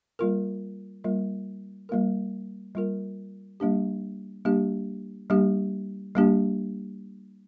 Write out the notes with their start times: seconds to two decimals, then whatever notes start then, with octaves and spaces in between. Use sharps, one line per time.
0.19 G3 A#3 F4 A#4
1.04 G3 A#3 F4 A#4
1.89 G3 A#3 F4 A#4
2.75 G3 A#3 F4 A#4
3.60 G3 A#3 D4 G4
4.45 G3 A#3 D4 G4
5.30 G3 A#3 D4 G4
6.15 G3 A#3 D4 G4